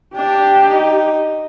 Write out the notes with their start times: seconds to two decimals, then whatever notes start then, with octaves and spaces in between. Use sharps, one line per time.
0.16 D4 G4
0.68 D#4